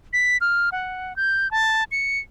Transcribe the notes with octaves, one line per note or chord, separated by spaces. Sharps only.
B6
F6
F#5
G6
A5
C#7